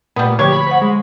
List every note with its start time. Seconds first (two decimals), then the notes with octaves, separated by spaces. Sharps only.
0.16 A#2 G3 A3 B3
0.39 D3 F3 G4 C#5
0.52 B5
0.67 C5 F#5
0.81 G#3